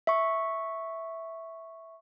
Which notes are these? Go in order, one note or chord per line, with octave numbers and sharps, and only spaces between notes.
E5 C#6